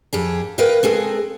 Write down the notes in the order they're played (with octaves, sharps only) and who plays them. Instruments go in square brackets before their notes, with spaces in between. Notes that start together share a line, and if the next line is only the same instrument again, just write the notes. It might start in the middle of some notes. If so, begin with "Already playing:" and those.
[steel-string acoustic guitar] F2 G4 G#4
A#4 B4 D#5 F5 G5
G#3 C4 G#4 A4